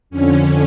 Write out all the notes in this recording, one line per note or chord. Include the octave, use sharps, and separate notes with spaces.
F2 D3 C#4